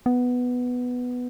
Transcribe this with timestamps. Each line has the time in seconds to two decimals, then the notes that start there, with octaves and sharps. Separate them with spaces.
0.06 B3